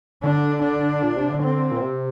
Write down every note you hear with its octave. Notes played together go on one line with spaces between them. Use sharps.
D3 D4
D4
A#2
C3
D3
C4
A#2
C3